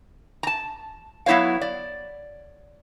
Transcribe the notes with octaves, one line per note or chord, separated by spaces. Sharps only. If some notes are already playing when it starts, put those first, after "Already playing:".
A5 A#5
F#3 B3 E4 C#5 F5
D5